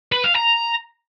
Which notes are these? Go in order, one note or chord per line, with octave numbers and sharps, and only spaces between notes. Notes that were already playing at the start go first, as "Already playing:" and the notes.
B4
F5
A#5